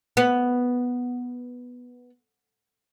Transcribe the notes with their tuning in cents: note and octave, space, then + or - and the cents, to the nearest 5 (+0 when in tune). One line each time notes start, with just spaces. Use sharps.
B3 -5